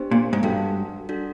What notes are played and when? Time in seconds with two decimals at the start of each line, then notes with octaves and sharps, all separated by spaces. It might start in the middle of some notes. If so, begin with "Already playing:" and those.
Already playing: B3 D4 G4 C5
0.11 A#2
0.33 G#2
0.43 G2 D4 F#4 A4
1.09 D4 F#4 A4